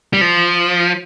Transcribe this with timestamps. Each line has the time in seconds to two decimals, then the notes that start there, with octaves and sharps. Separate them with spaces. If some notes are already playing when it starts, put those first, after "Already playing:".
0.13 G3
0.21 F3